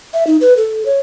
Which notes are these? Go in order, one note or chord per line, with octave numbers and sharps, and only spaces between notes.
E5
D#4
B4
A4
C#5